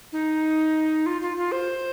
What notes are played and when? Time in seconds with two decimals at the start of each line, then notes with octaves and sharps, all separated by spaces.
0.12 D#4
1.06 F4
1.21 F4
1.37 F4
1.52 C5